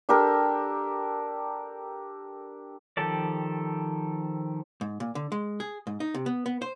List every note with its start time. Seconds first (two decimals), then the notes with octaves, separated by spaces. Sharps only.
0.09 D4 G4 A4 A#4
2.97 D#3 F3 G4 A4 D5
4.81 G#2
5.00 A#2
5.15 D3
5.32 G#3
5.60 G#4
5.87 G#2
6.00 D#4
6.14 C3
6.26 B3
6.46 B3
6.62 C5